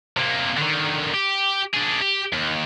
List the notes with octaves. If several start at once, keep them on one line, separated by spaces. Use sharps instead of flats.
C3 A#3
D3 D#3
G4
D4 G#4
G4
D#2